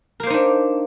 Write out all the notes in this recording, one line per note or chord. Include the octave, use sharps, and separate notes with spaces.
A#3 D4 D#4 A#4 C5